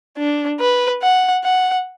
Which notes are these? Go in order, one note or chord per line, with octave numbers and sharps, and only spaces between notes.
D4
B4
F#5
F#5